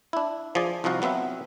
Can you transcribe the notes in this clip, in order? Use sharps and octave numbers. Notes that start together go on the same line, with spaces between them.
D4 E4
F3 G#4 D5
C2 F3 D#4 F#4 F5 A#5
F#3 B3 C4 E5 F#5